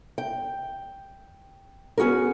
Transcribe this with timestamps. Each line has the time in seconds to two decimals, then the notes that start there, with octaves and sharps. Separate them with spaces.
0.18 G5
1.97 B3 C#4 F#4 G#4 A#4